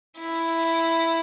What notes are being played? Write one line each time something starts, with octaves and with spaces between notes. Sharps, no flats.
E4